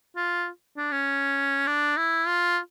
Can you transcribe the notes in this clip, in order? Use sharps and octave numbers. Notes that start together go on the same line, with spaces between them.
F4
D4
C#4
D4
E4
F4